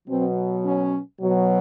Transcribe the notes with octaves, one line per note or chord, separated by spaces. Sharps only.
B2 F#3 C4
C#4
B2 F#3